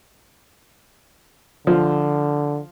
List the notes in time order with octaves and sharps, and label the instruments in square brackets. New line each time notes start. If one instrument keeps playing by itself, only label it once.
[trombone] D3 [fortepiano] F3